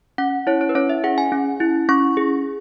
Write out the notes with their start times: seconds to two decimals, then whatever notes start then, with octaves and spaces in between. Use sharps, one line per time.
0.18 C#4 F#5
0.47 E4 C#5
0.61 C#5
0.69 B4
0.75 C#4 C#5
0.89 E5
1.04 G#4 F#5
1.18 G#5
1.32 C#4
1.60 E4
1.89 C#4 C#6
2.17 G#4